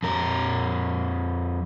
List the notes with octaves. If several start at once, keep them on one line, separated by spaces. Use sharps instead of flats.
F2 A#4